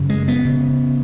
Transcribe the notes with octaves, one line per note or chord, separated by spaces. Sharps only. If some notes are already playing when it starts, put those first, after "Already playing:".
Already playing: F#2 C#3
G#3
B3
C#3